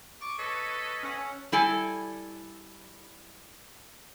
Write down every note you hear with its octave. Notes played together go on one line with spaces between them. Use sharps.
C#6 D6 D#7
A4 B4 C#5 D#5
C#4 A4 F#5
G3 E4 A4 G#5